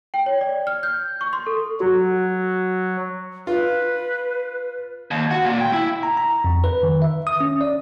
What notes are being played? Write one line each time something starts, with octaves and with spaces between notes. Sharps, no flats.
G5
C#5
D5
F6
G6
C#6
C6
A4
F#3 F#4
F4 B4
D#2
F#4
A#2
G5
E4
A#5
A#5
F2
B4
D#3
E5
D#6
C#4
D5